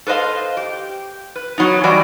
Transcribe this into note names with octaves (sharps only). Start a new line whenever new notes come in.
A4 B4 C5 D#5 F5
G4
B4
F#3 B3 D#4
E3 G3 F#4 D5 D#5